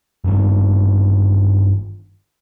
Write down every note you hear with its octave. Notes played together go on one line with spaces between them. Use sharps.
G1 G2 B2 D#3